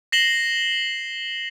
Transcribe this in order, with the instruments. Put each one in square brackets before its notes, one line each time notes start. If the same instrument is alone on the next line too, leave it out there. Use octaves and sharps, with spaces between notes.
[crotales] A#6 C7 E7 F#7 G7